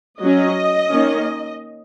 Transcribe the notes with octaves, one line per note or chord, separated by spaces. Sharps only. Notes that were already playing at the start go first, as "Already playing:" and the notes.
F#3 C#4 D#5
D#3 A#3 C#4